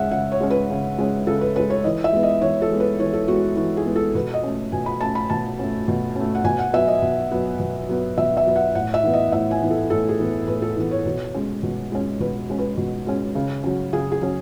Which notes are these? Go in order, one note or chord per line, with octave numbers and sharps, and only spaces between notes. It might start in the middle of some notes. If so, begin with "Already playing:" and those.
Already playing: C#3 G#3 C#4 E5 F#5
C#3 F#5
C#5
G#3 C#4
B4
C#3
G#3 C#4
C#3 A4
B4
G#3 C#4 B4
C#5
E3 D#5
E5
G#3 B3
D#5
E3 C#5
A4
G#3 B3
B4
E3 C#5
A4
G#3 B3 F#4
E3 F#4
G#4
G#3 B3
A4
B2 B4
D#5
A3 C#4
B2 G#5
B5
A3 C#4 A5
B5
B2 A5
A3 C#4
B2
A3 C#4
F#5
B2 G#5
F#5
F#3 B3 E5
D#5
B2
F#3 B3
B2
F#3 B3
B2 E5
E5
F#3 B3
F#5
A2 F#5
E5
E3 B3
D#5
A2 E5
G#5
E3 B3
A4
A2 A4
G#4
E3 B3
A2 B4
A4
E3 B3
C#5
B2
G#3 C#4
B2
G#3 C#4
B2 B4
G#3 C#4
B4
B2
G#3 C#4
C#3
F#3 C#4
C#3 G#4
G#4
F#3 C#4